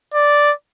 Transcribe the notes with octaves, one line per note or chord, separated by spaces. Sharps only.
D5